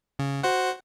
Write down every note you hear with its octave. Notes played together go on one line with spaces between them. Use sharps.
C#3
F#4 C5 F#5